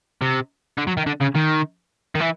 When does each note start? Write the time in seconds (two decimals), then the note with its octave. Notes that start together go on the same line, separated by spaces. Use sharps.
0.22 C3
0.78 D3
0.87 F#3
0.97 D#3
1.06 D3
1.21 C#3
1.35 D#3
2.15 D#3
2.20 E3